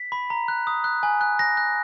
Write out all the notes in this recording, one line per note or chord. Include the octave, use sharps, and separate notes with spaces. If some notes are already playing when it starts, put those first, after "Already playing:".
Already playing: B6
B5
A#5
F#6
D#6
F#6
G#5
F#6
F#6 A#6
F#6